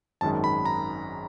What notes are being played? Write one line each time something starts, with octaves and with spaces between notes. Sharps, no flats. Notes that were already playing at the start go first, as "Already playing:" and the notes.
G#1 F#2 D#3 G#3 A5
B5
A#5